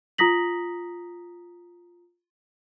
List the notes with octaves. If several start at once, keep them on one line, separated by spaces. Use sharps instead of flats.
F4 A#5 D#6 A#6 B6 F#7